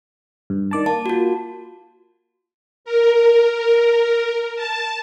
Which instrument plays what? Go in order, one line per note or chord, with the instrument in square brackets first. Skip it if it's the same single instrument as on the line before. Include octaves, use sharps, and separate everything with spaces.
[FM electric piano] G2
D#3 D5 A5
[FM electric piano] A#3 [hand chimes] A5
[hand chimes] F4 F#4
[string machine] A#4
A5